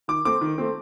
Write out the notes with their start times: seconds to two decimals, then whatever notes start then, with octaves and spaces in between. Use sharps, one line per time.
0.08 D#3 D6
0.25 A3 C4 D6
0.41 D#3
0.58 A3 C4